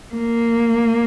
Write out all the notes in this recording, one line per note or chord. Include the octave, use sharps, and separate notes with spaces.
A#3